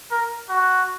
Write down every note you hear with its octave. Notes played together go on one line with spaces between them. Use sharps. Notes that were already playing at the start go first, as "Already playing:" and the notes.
A#4
F#4